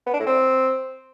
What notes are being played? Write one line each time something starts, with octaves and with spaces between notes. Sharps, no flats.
B3
D4
A2
C4